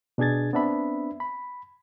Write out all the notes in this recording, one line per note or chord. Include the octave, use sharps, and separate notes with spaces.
B2 D4 G#4 G#6 A6
B3 C4 D4 E5 B5
B5